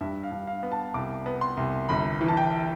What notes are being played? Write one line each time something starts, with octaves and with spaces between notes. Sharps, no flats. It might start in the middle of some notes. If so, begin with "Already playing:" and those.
G2 E5
F5
G2
F5
B3
A5
C2 D6
B3
C6
C2
G1 B5
E3
A5
G5